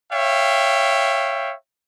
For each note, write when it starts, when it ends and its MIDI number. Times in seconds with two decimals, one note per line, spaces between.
0.12 1.54 73
0.12 1.54 76
0.12 1.54 77
0.12 1.54 79